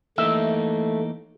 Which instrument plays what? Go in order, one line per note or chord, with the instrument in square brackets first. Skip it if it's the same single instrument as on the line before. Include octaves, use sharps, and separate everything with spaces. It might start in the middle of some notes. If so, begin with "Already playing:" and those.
[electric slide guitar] E3 A#3 D#4 [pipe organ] A3 [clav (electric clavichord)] E5